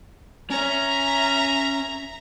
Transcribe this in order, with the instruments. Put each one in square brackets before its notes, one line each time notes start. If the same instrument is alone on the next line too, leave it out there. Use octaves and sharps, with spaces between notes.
[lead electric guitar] C#4 C#5 [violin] E5 A#5